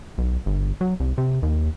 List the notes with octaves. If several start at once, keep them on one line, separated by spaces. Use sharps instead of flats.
B1
G1
F#3
C2
C3
D#2